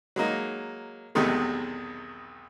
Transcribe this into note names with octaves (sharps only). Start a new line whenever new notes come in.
F#3 G#3 A#3 D#4
B1 E2 C3 D#3 G#3 A3